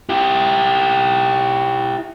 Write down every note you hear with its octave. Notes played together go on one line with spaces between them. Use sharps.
E4 G4